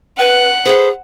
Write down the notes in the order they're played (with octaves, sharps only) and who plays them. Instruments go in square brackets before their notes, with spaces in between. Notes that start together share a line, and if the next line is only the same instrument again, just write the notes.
[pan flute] B4 [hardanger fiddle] F#5
[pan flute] G#4 [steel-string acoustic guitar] A4 B4 C5